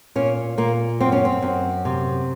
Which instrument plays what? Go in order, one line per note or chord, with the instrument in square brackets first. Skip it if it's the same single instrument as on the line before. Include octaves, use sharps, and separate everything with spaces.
[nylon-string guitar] A#2 C#4
A#2 A#3
F#2 C4
C#4
C4
F#2
C3